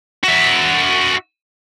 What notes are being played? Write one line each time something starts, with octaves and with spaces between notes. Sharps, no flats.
F#4 E5